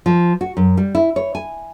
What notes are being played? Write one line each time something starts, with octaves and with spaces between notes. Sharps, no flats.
F3
F#4
F#2
G3
E4
C#5
G#5